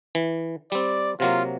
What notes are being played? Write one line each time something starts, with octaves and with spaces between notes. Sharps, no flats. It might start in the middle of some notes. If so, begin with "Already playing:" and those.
E3
G3 C4 D5
C3 F#3 A#3 F4